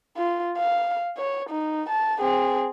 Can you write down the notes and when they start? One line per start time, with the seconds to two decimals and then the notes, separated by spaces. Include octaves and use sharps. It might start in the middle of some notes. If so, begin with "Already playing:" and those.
0.17 F4
0.57 F5
1.18 C#5
1.50 D#4
1.89 A5
2.20 C4 G#4